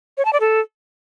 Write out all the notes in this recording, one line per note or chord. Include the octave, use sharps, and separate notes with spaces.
C#5
A5
D5
A4